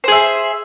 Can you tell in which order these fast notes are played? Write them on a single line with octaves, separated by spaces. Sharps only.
C5 G#4 E5